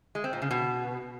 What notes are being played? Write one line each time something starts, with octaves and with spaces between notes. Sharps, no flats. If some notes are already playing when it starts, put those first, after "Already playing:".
G#3
C4
A#2
C#3
B2